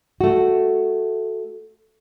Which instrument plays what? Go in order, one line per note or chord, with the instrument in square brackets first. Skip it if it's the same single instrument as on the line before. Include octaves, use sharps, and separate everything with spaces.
[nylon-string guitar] A3 F#4